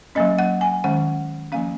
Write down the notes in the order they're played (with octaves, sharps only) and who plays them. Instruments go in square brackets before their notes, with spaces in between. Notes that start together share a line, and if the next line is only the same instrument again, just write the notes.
[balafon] F#3 A#3 C#4 D#5
F#5
G#5
D#3 G#3 C#4 F#5
F3 A#3 C#4 F5